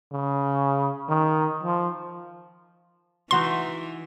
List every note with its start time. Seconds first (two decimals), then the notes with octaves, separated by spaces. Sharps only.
0.12 C#3
1.08 D#3
1.63 F3
3.31 E3 D#4 F#4 E5 C6